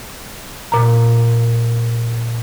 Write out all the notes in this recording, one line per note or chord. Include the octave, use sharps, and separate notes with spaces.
A#2 A#5